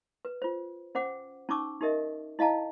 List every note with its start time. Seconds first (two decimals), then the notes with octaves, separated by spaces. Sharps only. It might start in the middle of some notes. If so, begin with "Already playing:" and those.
0.25 B4
0.42 F4 C5
0.95 C#4 C5 F#5 D6
1.49 C#4 D#4 A5 C#6 D6 E6
1.81 D#4 G4 A#4 D#5 E5
2.39 E4 D#5 F5 A5 A#5